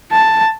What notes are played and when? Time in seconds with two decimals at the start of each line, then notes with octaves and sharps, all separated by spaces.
0.12 A5